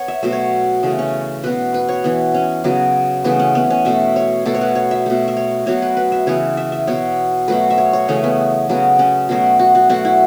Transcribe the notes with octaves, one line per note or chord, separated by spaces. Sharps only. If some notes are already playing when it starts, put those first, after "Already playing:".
Already playing: B3 C#5
E5
B2 F#3 A3 E5
C#5
C#3 E3 A3
C#4
B2 B3 B4
B4
C#5
E3 B3
C#4
C#3 F#3 B3
C#3 E3 A3 B3
C#4
B3
C#4
B2 A3 E5
C#5
B2 A3 A4
C#5
B4
C#5
E5
B2 A3
E5
C#5
B2 F#3 B3 C#5
B4
B4
E5
C#3 E3 B3 C#5
E5
E5
B2 B3 C#5
B2 F#3 A3 B4
E5
C#5
C#5
C#3 E3 A3 C#4
B3
C#3 F#3 B3
C#4
B2 F#3 A3
F#4
F#4
B2 F#3 A3 F#4
E4